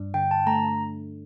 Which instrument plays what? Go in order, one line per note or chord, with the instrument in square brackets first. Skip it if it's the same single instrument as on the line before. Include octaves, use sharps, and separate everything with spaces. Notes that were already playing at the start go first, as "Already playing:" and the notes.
Already playing: [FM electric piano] G2 D4
[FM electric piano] D3 [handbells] G5
[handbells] A5
[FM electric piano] A3 [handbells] A#5